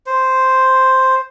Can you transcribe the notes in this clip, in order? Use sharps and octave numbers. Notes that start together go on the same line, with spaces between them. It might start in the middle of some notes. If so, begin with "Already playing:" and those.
C5